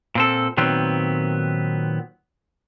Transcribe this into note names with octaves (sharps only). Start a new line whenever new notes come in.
A#2 C4 A4
A#2 D#3 F#3 B3 C4